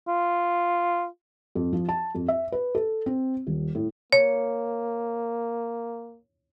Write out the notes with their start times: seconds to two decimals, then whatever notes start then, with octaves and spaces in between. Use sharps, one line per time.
0.08 F4
1.55 F2
1.73 F3
1.89 A5
2.15 F2
2.28 E5
2.52 B4
2.75 A4
3.06 C4
3.47 D#1
3.75 A2
4.13 A#3 C#5